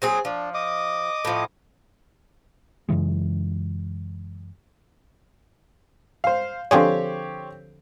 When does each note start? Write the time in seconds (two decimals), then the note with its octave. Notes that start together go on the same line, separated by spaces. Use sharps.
0.02 F#3 C4 G#4
0.25 F3 D4
0.54 D#5 D6 D#6
1.25 A2 F3
2.89 F#2 C#3 E3 G#3
6.24 C5 F5
6.71 D3 F3 C4 G4 G#4 C#5